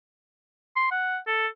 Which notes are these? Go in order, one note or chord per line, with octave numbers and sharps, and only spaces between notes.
C6
F#5
A4